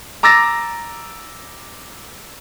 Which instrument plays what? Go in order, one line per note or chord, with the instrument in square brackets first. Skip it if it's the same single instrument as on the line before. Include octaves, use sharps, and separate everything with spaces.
[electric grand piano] A#5 D6 E6 A6 A#6